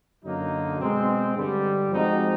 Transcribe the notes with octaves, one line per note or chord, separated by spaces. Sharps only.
F#2 D3 F#3 A#3 D#4
B2 G#3 C4
G2 D3 G3
F3 G#3 C4 D#4 F#4